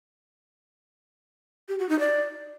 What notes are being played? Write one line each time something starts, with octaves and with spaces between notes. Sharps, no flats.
G4
F#4
D#4
D5